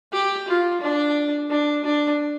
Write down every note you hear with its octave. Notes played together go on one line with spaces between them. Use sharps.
G4
F4
D4
D4
D4